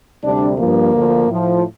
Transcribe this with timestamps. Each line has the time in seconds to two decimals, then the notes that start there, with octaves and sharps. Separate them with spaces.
0.23 D2 C3 G3 D4
0.58 G2 F3 A#3
0.93 D2 D3 F3
1.27 A2 F3